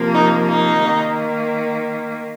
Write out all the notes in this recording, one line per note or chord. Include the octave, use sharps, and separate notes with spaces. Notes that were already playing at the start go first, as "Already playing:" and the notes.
Already playing: C3 F3 A#3
D#4
D#4
D#3 A#3